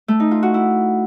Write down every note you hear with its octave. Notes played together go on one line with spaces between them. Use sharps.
A3
D#4
F4
F#4
E4